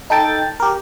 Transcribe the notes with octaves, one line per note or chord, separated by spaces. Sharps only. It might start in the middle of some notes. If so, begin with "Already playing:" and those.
D#4 A4 G5 A6
G4 A#4